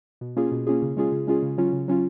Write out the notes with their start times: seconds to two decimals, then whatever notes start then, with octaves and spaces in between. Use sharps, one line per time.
0.21 B2
0.37 A#3 C#4 F4 G#4
0.52 B2
0.67 A#3 C#4 F4 G#4
0.82 C#3
0.97 G#3 C#4 F4 G#4
1.12 C#3
1.27 G#3 C#4 F4 G#4
1.43 C#3
1.58 F#3 C#4 F4
1.73 C#3
1.88 F#3 C#4 F4